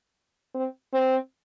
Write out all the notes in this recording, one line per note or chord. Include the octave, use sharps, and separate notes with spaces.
C4
C4